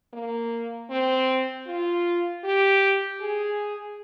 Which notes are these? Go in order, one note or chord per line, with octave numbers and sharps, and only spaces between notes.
A#3
C4
F4
G4
G#4